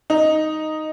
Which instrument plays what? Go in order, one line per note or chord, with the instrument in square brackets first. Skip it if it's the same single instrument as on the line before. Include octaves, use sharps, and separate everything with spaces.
[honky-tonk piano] D#4